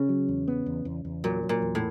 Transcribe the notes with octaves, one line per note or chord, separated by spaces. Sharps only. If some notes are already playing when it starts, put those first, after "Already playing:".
Already playing: C#3
F#3
E2
B3
E2
E2
E2
A#2 F#3
F#3
A#2
E2
A2